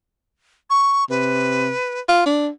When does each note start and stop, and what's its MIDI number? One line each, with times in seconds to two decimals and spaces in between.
0.70 1.05 85
1.10 1.72 48
1.10 2.00 71
2.09 2.25 65
2.26 2.49 62